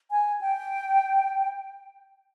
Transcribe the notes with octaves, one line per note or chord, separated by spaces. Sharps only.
G#5
G5